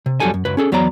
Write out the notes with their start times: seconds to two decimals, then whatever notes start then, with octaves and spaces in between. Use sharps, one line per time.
0.06 C3
0.20 F2 C3 F#3 G3 A4 G#5
0.34 F#2
0.45 C#2 F#2 F#3 B4
0.57 C#4 G#4 A4
0.72 E2 F#3 B3 C#5 D5 A#5